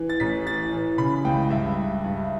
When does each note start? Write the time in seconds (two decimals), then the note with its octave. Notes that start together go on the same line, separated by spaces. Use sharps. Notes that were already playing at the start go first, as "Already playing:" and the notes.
Already playing: E3
0.09 A6
0.20 A1 B6
0.46 E3 A6
0.73 E3
0.98 C#3 B5
1.24 C#2 G5
1.51 G2 E5
1.78 G2
2.04 G2